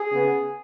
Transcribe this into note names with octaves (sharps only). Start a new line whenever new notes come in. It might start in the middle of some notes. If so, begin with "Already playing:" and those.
Already playing: G#4
C#3 B3